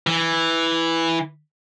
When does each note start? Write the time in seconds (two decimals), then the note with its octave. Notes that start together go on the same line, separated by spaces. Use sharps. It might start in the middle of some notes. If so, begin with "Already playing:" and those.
0.07 E3